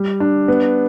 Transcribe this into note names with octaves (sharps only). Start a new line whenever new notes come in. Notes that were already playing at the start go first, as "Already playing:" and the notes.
Already playing: G3
D4
B3